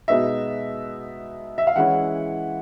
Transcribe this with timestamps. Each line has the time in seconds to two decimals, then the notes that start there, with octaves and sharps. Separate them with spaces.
0.08 B2 G#3 B3 D#4 E5
1.58 E5
1.67 F5
1.76 E3 G#3 C#4 E4 F#5